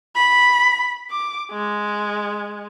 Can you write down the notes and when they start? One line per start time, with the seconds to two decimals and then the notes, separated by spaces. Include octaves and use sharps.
0.16 B5
1.11 D6
1.52 G#3